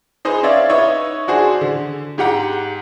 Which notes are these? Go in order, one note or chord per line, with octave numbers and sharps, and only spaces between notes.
D#4 G#4 B4 C5 D#5
C#4 C#5 D5 E5 F5
D#4 B4 C#5 D#5 E5
D4 F#4 G#4 C5
D3
G#2 G4 F#5 A#5